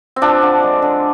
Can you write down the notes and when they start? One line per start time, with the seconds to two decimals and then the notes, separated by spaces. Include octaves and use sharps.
0.16 C4
0.22 F3 D4
0.42 D3
0.63 G#3
0.82 D3